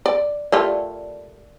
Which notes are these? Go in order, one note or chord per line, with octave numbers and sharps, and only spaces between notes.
D5
G3 A3 F4 A#4 D5